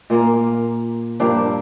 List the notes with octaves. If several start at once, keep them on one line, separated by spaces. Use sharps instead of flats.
A#2 A#3 F4 A#4
G2 F3 A#3 D4